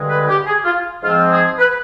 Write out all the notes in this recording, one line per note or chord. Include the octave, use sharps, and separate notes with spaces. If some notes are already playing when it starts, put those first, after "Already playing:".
Already playing: G2 D3 G#3
B4
G4
G#4
F4
G#2 F3 C4 F4
G#4
B4